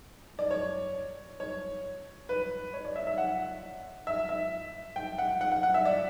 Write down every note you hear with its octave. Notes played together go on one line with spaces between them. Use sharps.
D5
C#5
C#5
B4
C#5
D5
E5
E5
F#5
E5
E5
G5
F#5
F#5
F#5
F#5
E5
D5